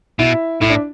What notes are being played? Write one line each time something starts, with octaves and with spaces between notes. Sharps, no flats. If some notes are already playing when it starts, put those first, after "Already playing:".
B2 E4
A2 E4
D4